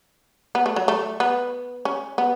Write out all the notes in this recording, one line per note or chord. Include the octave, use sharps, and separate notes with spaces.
B3
A3
F#3
A3
B3
C#4
B3